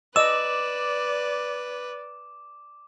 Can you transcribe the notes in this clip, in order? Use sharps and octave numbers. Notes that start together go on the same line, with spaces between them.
B4 D5 D#5 D6 E6 E7